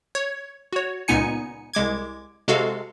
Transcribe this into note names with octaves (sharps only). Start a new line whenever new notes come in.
C#5
F#4 C#5
C#2 A#2 B3 D#4 G#5 C#7
C2 G#3 D6 G#6
C3 G#3 F#4 A4 F5